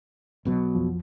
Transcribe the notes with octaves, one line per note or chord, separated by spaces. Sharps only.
B1 B2 F#3
F2 F3